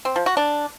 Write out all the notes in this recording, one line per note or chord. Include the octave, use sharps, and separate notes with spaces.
C4
F3
F#4
D4